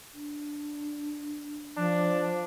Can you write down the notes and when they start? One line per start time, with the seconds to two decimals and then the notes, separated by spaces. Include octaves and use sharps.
0.14 D4
1.77 F3 D4